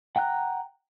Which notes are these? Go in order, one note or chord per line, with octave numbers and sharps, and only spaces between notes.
F#5 G5 A#5 F#6